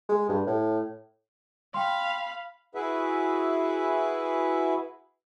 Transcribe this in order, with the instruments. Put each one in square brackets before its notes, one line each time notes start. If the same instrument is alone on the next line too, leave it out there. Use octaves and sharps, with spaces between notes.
[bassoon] G#3
G2
A2
[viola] F5 B5 [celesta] G5 C6
[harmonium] E4 F#4 G#4 B4 E5